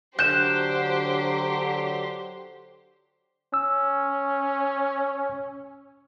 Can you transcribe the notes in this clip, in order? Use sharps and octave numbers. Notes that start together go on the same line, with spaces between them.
D3 F#3 G4 C5 F#6 G6 E7
C#4 E6